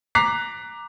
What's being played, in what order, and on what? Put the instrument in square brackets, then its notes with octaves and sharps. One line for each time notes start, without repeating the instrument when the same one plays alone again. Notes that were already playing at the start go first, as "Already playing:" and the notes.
[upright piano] A#5 D6 F#6 B6 C7